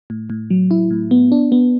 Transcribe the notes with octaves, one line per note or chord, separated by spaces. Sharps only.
A2
A2
F#3
E4
A2
B3
D4
B3